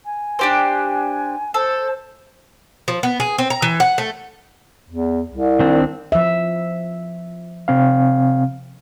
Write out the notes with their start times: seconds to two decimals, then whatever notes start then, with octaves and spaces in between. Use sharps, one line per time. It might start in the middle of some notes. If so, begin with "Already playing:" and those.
0.05 G#5
0.39 D4 G4 C5
1.54 A4 C5
2.88 F3
3.03 B3
3.20 G#4
3.38 C4
3.50 A#5
3.62 E3
3.80 F#5
3.98 A3
4.90 E2
5.31 C2
5.59 D#3 C4 D4
6.12 F3 E5
7.68 C3 C4 F5